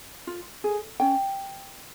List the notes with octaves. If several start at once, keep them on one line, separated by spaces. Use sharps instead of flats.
F4
G#4
C#4 G5